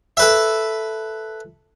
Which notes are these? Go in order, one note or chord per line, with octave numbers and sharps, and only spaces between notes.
A4 B4 E5